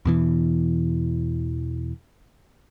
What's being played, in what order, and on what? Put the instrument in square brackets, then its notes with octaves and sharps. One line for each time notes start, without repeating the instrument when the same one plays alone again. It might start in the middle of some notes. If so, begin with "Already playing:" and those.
[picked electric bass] E2 B2 E3